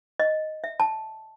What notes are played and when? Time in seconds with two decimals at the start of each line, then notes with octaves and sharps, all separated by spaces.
0.20 D#5
0.64 E5
0.80 A5